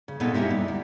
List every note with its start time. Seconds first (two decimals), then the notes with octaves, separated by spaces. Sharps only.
0.08 C#3
0.20 A#2 B3 C4 D#4 A4
0.34 A#3 C#4 D#4 E4 G4
0.51 G3
0.68 D2